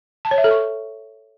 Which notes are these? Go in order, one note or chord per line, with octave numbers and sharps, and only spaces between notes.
A5
C#5
E5
A4
C#6